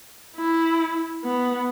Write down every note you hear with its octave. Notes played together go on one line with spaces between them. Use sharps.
E4
B3